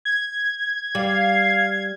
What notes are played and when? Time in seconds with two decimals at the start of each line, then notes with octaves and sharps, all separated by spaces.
0.05 G#6
0.95 G3 F5